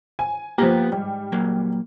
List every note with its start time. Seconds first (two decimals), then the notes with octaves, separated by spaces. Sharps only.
0.19 G#5
0.58 F3 A#3 B3 G4 A#5
0.92 G#2 G3
1.32 A#2 F#3 A#3